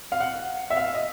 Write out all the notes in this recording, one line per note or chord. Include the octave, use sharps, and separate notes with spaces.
F5
F#5
E5
F5
D#5